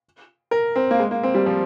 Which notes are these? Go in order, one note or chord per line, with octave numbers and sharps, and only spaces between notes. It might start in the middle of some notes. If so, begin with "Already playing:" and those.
A#4
C4
A#3
G#3
A#3
C4
G3
F3